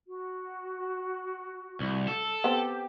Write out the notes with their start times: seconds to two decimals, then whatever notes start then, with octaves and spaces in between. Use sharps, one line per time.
0.07 F#4
1.80 C2
2.08 A4
2.44 B3 C4 G4